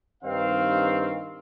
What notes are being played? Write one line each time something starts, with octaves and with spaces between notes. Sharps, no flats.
G2 D#3 C4 F5